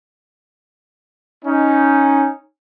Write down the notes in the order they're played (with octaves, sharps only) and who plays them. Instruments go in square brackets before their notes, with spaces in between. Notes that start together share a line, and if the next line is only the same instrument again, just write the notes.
[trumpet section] C#4 D#4